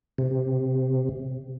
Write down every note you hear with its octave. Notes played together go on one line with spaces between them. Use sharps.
C3